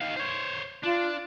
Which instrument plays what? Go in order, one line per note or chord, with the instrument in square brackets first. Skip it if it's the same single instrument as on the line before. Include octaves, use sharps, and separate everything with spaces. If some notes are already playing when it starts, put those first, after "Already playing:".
[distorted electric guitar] D#3 F5
C5 C#5
[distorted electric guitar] D4 [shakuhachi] F4